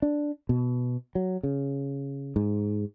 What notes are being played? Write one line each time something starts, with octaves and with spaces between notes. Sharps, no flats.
D4
B2
F#3
C#3
G#2